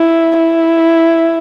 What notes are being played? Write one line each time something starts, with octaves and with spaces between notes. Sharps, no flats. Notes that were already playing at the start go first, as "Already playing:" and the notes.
Already playing: E4
E4